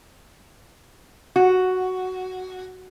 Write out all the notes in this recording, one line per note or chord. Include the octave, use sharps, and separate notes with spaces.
F#4